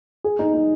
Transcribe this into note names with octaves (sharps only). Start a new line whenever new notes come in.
G#4
D#4
D#4